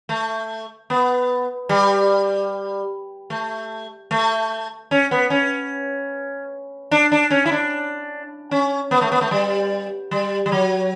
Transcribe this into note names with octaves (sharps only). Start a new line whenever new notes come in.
A3
B3
G3
A3
A3
C#4
B3
C#4
D4
D4
C#4
E4
D4
C#4
B3
A3
B3
A3
G3
G3
G3
F#3